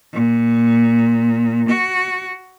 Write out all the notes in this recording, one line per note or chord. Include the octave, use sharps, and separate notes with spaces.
A#2
F#4